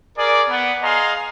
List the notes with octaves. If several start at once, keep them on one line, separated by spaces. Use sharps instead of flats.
G#4 A#4 D5
B3
G#4 D#5 F5 A#5 C6